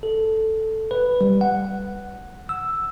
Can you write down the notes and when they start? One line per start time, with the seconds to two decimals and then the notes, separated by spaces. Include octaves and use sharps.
0.03 A4
0.91 B4
1.21 G3
1.41 F#5
2.49 E6